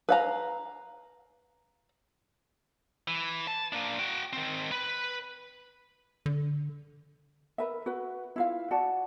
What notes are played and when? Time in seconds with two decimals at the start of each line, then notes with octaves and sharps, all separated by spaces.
0.09 B4 F5 A#5
3.08 E3
3.47 A5
3.73 A#3 D4
3.99 F#4 G5
4.33 D#3 C4
4.71 B4 B5
6.26 D3
7.58 A#4 B4 E5
7.86 F#4 B4
8.36 E4 F4 F5
8.71 F#4 D5 F#5 A5